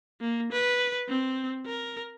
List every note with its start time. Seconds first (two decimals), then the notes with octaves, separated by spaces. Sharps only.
0.21 A#3
0.52 B4
1.08 C4
1.66 A#4